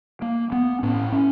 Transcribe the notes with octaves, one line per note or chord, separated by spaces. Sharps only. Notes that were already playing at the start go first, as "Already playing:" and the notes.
A#3
B3
A2 C#4
C#4